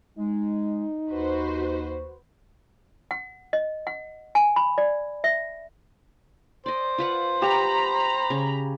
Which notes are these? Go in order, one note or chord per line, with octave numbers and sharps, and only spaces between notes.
G#3 D#4
D#2 F#4 B4 C5
F#5
D#5
F#5
G#5
B5
D5
E5
C5 D5 D#5
F4 B4 F#5
G4 A#5 B5
C#3